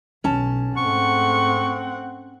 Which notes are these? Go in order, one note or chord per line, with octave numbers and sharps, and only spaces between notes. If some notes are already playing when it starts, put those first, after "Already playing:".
B1 C#4 A5
G#2 A3 C4 F#5 C#6